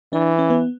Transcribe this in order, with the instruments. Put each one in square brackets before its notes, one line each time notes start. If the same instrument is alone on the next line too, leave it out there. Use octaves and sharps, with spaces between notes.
[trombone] E3 [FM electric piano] D4
[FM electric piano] C#4
B3